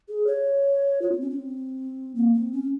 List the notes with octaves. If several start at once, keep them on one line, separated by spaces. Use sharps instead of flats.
G#4
C#5
F4
C4
C#4
C4
A#3
C4
C#4